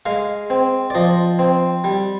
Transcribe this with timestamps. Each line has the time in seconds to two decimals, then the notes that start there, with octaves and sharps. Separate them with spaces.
0.06 G#3 F5
0.50 C4
0.90 D5
0.95 F3 D#5
1.39 C4
1.84 G3